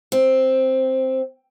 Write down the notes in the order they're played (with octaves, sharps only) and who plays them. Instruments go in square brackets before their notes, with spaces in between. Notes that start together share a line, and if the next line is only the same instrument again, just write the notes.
[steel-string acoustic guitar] C4